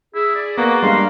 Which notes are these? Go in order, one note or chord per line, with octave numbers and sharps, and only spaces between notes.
E4 G#4
D5
A#3 B3 F#4
G3 G#3 D4 F5 C6